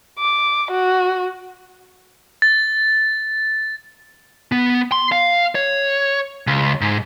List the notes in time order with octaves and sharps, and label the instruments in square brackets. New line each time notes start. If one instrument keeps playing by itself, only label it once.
[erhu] D6
F#4
[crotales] A6
[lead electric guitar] B3
C6
F5
C#5
C#2
G#2